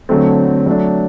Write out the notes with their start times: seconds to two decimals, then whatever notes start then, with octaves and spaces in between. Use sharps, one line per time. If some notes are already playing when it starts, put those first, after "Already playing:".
0.09 D3 F#3 A3 C4
0.66 F#3 A3 D4